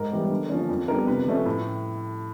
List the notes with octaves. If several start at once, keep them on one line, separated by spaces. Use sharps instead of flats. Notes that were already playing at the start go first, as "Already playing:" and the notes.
Already playing: G#2 A#4
E3 G3 B3
D3
F3 A#3 C#4
F2
D3 G3 B3 A#4
C3 B4
F3 A3 C#4
A2